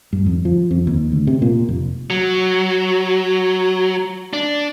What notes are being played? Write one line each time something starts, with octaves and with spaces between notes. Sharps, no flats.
G2
F2
F3
F2
D#2
D2
C3
A#2
F1
F#3
D4